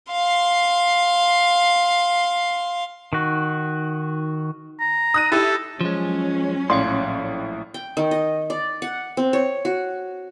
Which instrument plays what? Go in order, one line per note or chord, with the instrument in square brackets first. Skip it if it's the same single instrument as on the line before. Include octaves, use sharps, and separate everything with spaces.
[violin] F5 C6
[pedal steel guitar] D#3 F#4
[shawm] A#5
[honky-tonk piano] D#6 F#6 D#7
[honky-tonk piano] E4 G4 [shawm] A4
[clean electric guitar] F3 G#3 [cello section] F#3 C#4
[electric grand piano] A#1 A2 D5 [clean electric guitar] C#5 F5 C6
[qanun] G5
D#3
D#5
D5
F#5
C4
C#5
F#4